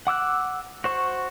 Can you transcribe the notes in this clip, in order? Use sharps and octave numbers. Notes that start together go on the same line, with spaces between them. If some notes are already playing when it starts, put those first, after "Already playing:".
F#5 D6 E6 F#6
F#4 C5 C#6